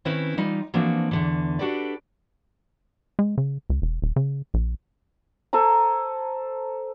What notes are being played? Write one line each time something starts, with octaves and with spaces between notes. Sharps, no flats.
D#3 C4 C#4 E4 B4 C5
E3 G3 D#4 F4
E3 F3 A#3 C4 D4 F#4
E2 D3 E3
D4 F#4 G4 A4 B4 D5
G#3
C#3
C#2
E1
D#1
C#3
A#1
A4 C5 G#5 A#5